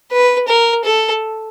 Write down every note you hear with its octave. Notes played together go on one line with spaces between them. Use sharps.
B4
A#4
A4